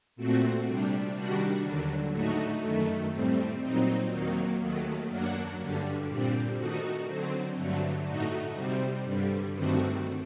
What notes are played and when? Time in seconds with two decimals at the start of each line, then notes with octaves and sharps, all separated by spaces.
0.16 A#2 A3 C4 F#4
0.66 C3 G3 D4
1.14 D#3 G3 D4 F#4
1.63 D#2 D3 F#3
2.12 A2 A3 D#4 F#4
2.63 F#2 D#3 A3
3.11 A2 G3 C4
3.61 A#2 F#3 C4 D#4
4.10 D#2 D#3 F#3 A#3
4.59 D#2 D#3 F#3 A3
5.09 F#2 F#3 A#3 D4 F#4
5.59 G2 D3 G3 D4
6.07 A#2 G3 C4
6.56 D#3 A3 D#4 F#4
7.06 D3 F#3 C4
7.56 G2 D3 F#3 A3
8.05 A2 A3 D#4 F#4
8.54 C3 G3 C4
9.03 G2 D3 G3
9.53 G2 D#3 A3 C4 F#4